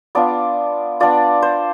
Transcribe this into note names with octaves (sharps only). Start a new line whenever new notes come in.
B3 D4 F4 D5
B3 D4 F4 D5
C5